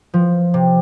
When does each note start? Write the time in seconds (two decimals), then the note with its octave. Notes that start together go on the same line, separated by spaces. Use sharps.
0.14 F3
0.54 C3